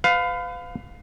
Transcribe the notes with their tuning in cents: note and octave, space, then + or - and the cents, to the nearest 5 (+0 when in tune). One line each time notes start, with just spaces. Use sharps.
B4 +35 F5 +15